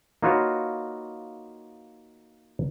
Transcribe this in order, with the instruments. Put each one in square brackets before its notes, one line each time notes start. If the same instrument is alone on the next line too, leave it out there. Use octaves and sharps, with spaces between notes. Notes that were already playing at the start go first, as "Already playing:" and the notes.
[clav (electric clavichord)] A#3 D#4 F4 F#4 B4 C#5